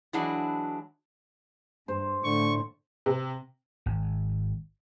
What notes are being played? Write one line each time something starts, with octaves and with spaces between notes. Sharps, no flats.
E3 F#3 G#3 D4 E4 F#4
G2 C5
A2 D3 C#6
C3
G#1